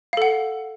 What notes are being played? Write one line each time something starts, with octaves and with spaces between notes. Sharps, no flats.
A4 F5 F#5